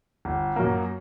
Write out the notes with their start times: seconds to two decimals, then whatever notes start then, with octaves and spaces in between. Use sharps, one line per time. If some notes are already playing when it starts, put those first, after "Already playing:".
0.25 G1
0.56 F#2 F#3 A#3